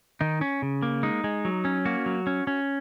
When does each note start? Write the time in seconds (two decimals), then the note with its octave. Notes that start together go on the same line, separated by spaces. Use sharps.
0.21 D#3 D#4
0.41 C#4
0.62 C#3
0.83 A#3
1.03 G#3 D#4
1.24 G#3
1.45 F#3
1.65 C#4
1.85 A#3 F#4
2.06 F#3
2.27 C#4
2.47 C#4